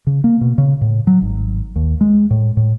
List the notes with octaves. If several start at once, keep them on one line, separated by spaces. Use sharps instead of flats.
C#3
A#3
B2
C#3
A2
F#3
G#1
D#2
G#3
A2
A2